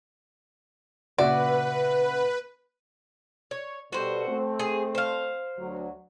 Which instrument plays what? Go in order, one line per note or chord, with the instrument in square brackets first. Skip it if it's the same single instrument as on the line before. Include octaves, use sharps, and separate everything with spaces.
[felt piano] A#2 C#3 E5 [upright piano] F#4 [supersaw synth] B4 [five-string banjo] D5
[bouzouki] C#5
[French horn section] B2 G3 A4 [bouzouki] F#4 C5
[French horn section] A3 C4
[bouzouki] G#4
C5 F5
[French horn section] D2 F#3